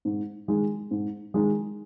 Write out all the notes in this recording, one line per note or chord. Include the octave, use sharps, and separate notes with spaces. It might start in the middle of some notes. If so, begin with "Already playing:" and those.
G#2
D#3 G#3
G#2
D#3 G#3